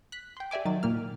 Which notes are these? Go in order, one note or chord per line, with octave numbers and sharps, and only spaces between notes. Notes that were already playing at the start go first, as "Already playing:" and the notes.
F#6 B6
G5 C6
G4 D5 E5 G#5 D6
D#3 F#3 A6
A#2 A#3 F6